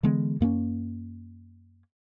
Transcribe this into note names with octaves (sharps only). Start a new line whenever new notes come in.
D3 E3 G#3 B3
F#2 A#3 C4 C#4